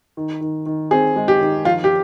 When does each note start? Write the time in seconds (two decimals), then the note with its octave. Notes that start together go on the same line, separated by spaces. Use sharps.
0.17 D#3
0.41 D#3
0.66 D#3
0.91 C4 G#4
1.16 G#3
1.28 G4
1.41 D#3
1.65 F3 F4
1.84 G4